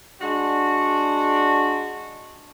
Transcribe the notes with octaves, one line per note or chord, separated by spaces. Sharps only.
G#3 D4 F#4